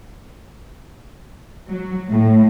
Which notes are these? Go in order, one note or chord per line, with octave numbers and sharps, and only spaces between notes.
F#3
A2